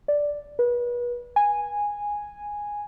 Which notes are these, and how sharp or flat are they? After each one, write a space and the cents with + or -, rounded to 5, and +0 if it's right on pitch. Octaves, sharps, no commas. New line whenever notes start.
D5 -5
B4 -35
G#5 -10